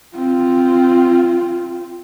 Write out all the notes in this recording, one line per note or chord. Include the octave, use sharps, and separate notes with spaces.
C4 F4